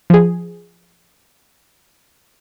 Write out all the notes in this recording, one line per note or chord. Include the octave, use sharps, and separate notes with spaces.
F3 G#4